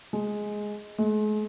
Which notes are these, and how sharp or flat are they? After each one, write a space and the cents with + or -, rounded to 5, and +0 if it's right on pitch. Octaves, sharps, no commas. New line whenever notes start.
G#3 +5
G#3 +40